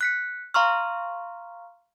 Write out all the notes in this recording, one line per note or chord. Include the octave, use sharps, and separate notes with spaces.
F#6 B6 C#7
F5 A#5 C6 C#6 F6